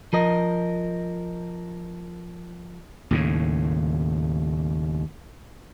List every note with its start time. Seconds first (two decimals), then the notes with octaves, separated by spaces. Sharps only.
0.13 F3 A#4 D#5
3.11 D#2 A2 C#3